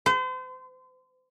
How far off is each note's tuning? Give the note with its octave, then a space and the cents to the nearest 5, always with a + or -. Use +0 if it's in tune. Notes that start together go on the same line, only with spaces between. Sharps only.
C5 -40